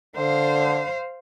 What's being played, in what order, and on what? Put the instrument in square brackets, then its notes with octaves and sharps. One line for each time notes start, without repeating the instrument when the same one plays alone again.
[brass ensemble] D3 [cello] C5 F5